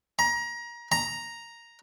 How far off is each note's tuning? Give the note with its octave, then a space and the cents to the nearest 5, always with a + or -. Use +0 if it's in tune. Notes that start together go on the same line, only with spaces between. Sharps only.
A#5 +25
A#5 +0